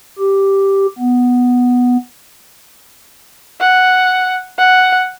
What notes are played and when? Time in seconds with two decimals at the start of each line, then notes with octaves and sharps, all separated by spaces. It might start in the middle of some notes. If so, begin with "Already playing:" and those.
0.19 G4
0.98 B3
3.61 F#5
4.59 F#5